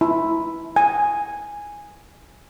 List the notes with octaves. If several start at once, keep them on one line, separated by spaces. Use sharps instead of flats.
E4
G#5